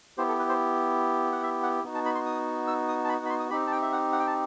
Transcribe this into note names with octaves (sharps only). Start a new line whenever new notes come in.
B3 E4 G4 C5
A4
B4
C5
F#5
E5
F#5
B3 D#4 F#4
A5
B5
C6
D#6
E6
D#6
A5
B5
F#5
B5
C6
D#6
C4 D#4 G4 B5
A5
G5
E5
F#5
F#5
G5
A5